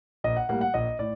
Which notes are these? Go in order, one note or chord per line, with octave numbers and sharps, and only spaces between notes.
A#1 D#5
F#5
A2 G3 A#3 F#5
F#5
A#1 D#5
A2 D5